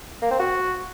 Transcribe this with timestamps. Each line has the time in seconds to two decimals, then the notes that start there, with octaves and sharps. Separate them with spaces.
0.22 A#3
0.31 C4
0.39 F#4